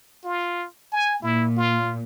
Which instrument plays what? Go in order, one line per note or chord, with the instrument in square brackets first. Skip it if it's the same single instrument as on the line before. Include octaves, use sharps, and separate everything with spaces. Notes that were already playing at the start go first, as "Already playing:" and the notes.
[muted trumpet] F4
G#5
[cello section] A#2 [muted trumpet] E4
[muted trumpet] F4